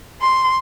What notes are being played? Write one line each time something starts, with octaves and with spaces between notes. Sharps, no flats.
C6